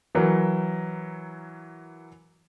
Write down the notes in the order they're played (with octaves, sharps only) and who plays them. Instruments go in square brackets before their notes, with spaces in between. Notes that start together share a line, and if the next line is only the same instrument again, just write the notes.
[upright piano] E3 F#3 A#4